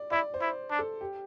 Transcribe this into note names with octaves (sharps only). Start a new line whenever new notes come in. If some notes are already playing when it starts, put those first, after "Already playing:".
Already playing: D5
E4 D5
C5
E4
D4
A4
G4